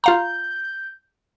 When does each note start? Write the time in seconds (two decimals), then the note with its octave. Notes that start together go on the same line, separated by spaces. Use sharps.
0.04 F4 F5 A#5 G6